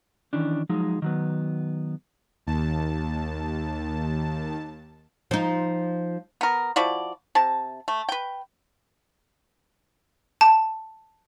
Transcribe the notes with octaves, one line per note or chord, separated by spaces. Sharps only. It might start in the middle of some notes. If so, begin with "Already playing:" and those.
D#3 E3 C#4 D4
F3 F#3 G#3 D#4
D#3 F#3 B3
D#2 A5
F3 D#4
B3 A#4
F3 E4 F#4 D5
C3 A5
A3
B4 G5
A5